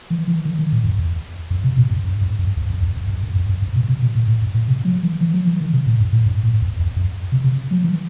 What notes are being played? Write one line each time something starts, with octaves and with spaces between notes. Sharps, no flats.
E3
E3
D#3
D#3
A2
F#2
E2
F#2
C3
B2
G2
G2
G2
F#2
E2
F#2
E2
F#2
F#2
G2
F#2
F#2
G2
B2
C3
B2
A2
A2
G2
A2
C3
F#3
E3
E3
F#3
E3
D#3
C3
A2
G2
A2
G2
A2
E2
E2
F#2
C3
C3
F#3
E3